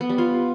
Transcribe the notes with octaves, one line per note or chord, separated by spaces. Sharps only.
B3
G3
F4